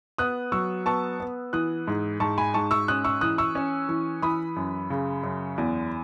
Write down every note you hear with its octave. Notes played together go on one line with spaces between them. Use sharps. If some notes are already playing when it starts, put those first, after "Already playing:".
B3 D#6 F#6
F#3 C#6 E6
B3 A5 C#6
B3
E3 D#6 F#6
G#2
G#2 A5 C#6
G#5 B5
G#2 A5 C#6
C#6 E6
C#4 D#6 F#6
C#6 E6
E3 D#6 F#6
C#6 E6
C#4
E3
E3 B5 D#6
F#2
C#3
F#2
E2